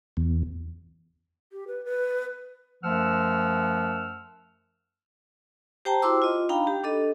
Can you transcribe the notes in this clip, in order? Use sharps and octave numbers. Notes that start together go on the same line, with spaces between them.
E2
G4
B4
B4
F#2 F3 A3 F#5 E6 F6
G4 C5 G5 A5 A#5
E4 F#4 C5 C6 D6 E6
F4 D#5
D4 D#4 F5 G5 A#5 B5
G4
D4 A4 D#5